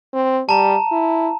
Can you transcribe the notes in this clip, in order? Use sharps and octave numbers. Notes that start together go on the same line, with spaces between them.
C4
G3 A5 A#5
E4